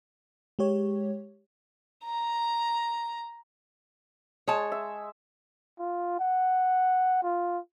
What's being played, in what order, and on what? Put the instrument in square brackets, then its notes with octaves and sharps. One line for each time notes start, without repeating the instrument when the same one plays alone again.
[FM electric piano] G#3 G4 C#5
[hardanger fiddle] A#5
[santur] G#3 [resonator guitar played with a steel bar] C#5 A5
[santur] E5
[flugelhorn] F4
F#5
F4